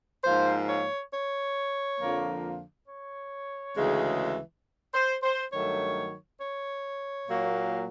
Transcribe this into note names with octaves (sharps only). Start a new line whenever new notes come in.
G#2 F3 A#3 C5
C#5
C#5
F2 D3 F3 A#3
C#5
D2 C#3 E3 G#3
C5
C5
G2 D#3 F#3 A3 C#5
C#5
A#2 F#3 A#3